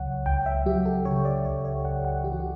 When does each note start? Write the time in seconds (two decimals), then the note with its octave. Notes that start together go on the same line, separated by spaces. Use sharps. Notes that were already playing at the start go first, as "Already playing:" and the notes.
Already playing: C#2 C#3 F#3 C#5 F#5
0.26 C#2 G5
0.46 E5
0.66 F#3 G4
0.86 A4
1.05 C#3 C#5
1.25 D5
1.45 C#2 C#5
1.65 C#5
1.84 C#2 F#5
2.05 F#5
2.24 E3 G4
2.32 F#4
2.40 G4